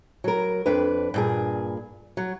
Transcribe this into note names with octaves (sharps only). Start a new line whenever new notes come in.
F#3 A#4
F2 D4 B4
G2 A#2 G#4
F#3